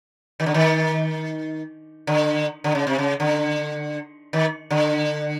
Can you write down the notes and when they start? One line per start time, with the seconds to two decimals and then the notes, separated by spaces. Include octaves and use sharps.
0.40 D#3
0.46 D3
0.54 D#3
2.07 D3
2.64 D3
2.75 C#3
2.87 C3
2.98 C#3
3.20 D3
4.33 D#3
4.70 D3